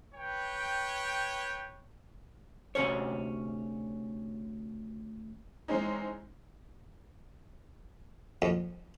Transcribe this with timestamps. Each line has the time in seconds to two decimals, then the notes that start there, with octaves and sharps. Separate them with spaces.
0.15 B4 C#5 G5
2.75 D2 C3 C#4 C#5
5.68 E3 G#3 C4 C#4 D#4
8.42 F2